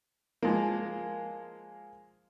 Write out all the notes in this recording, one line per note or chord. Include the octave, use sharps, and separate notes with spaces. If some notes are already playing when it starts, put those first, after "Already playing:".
F3 G#3 A#3